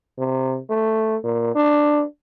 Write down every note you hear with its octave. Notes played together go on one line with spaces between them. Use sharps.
C3
A3
A#2
D4